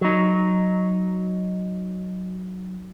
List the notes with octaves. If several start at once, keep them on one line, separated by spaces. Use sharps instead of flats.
F#3 D#4